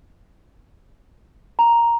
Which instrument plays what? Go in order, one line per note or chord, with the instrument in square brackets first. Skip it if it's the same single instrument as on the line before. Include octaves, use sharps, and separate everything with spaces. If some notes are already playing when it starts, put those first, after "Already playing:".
[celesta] A#5